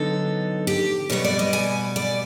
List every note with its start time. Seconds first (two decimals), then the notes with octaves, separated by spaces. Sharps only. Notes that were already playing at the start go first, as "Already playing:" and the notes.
Already playing: D3 F#3 B3 D#4 A4
0.67 G4
1.10 B2 G3 B3 C#5
1.25 D5
1.39 D#5
1.53 G#5
1.96 D5